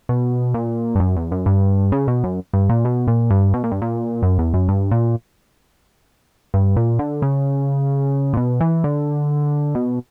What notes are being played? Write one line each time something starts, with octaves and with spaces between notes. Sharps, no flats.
B2
A#2
G2
F#2
E2
F#2
G2
C#3
B2
F#2
G2
A#2
B2
A#2
G2
B2
A#2
G2
A#2
F#2
E2
F#2
G2
A#2
G2
A#2
D3
C#3
A#2
B2
E3
D3
B2